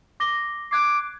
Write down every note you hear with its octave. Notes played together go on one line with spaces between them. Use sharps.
D6 A#6 G7
D6 F#6 G#6 C7